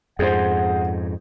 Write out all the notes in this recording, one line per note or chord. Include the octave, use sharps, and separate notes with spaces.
F2 G#2 G#4 C5 F#5